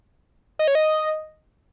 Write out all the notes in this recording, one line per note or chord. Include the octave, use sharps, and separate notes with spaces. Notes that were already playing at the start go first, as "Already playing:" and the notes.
D#5
C#5
D#5